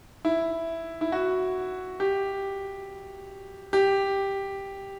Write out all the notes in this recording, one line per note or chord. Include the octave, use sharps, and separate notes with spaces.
E4
E4
F#4
G4
G4